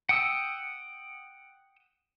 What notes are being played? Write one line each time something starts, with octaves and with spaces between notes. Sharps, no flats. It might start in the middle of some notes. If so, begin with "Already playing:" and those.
F#5 G5 D#6 E6